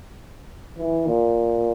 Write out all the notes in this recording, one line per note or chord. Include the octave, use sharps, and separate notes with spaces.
E3
A#2